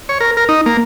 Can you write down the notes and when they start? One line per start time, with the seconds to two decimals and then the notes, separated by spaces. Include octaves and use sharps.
0.09 C#5
0.21 A#4
0.37 A#4
0.49 D#4
0.66 A#3